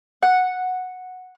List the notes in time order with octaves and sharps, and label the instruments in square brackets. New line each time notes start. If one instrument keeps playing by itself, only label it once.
[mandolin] F#5